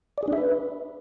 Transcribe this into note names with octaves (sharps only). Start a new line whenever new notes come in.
D5
G#4
D4
E5
B4